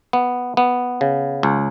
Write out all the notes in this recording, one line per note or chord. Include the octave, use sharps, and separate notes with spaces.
B3
B3
C#3
C#2